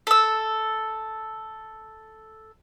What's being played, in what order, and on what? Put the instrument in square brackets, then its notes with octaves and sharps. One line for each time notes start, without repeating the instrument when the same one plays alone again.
[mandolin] A4 E6